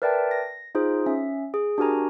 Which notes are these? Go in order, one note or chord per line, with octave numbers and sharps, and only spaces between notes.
A#4 B4 D5 E5 G5 A5
A#6
D#4 F4 G#4 C5
C#4 E5
G#4
D4 F#4 G4 A#4 G#5 A#5